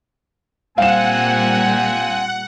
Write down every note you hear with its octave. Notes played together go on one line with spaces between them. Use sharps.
A#2 G3 A#3 C4 F5 F#5 G#5 E7